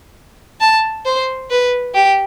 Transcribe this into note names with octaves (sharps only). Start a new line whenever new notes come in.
A5
C5
B4
G4